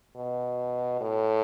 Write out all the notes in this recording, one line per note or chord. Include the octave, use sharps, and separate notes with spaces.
B2
A2